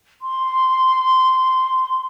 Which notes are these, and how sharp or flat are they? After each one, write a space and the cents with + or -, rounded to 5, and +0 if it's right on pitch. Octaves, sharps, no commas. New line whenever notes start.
C6 -10